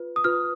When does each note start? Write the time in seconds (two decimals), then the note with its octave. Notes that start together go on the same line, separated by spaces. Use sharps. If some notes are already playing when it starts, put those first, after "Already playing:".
Already playing: F4 B4
0.16 D#6
0.24 F4 B4 F6